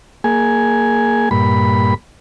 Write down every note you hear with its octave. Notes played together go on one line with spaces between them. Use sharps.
A#3 G#4 G#5
G2 A#2 B5